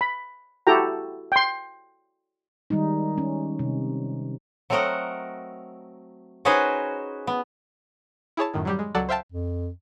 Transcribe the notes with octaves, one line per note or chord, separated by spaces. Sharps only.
B5
E4 F#4 G4 A4 G5 A#5
G5 C6
D#3 G3 G#3 D#4
C#4
C3
F#3 A3 C4 A#4 D#5 F#5
C#4 D#4 F#4 G#4 B4 C5
B3
E4 G#4 C#5 A5
F#2 A2 D#3
F#3 G3 G4
G#3
C#2 F#3 A4 D5 F#5
C5 E5 F5 G5 A5
F2